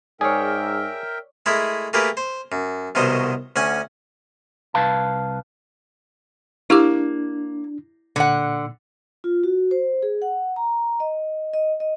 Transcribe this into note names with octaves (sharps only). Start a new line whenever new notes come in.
G#2 G#4 A#4 C#5 D5 E5 G5
G#3 A3 E4 G#4 A#4
A3 A#3 G4 G#4 A#4 B4
C5
F#2
C2 B2 D#3 F#3 C5 D#5
D2 C#4 C#5 F#5 G#5
C2 B4 F5 A5
A#3 D4 E4 G4 D6
A#2 D3 F#5
F4
F#4
C5
G#4
F#5
A#5
D#5
D#5
D#5